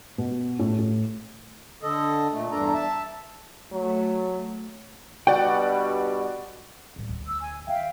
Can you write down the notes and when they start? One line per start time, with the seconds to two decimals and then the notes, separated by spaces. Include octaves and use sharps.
0.18 B2
0.59 A2
0.78 A2
1.83 D3 A4 D#5
2.32 A#2 A3
2.51 E2 G2 D4 A4 A#5
2.73 E5 A5
3.72 F#3 A3
5.27 G2 B2 G3 F#4 D5 F#5 G5
6.96 A2 G3
7.09 D2
7.27 E6
7.40 G#5
7.67 D#3 A#3 E5 F5 G5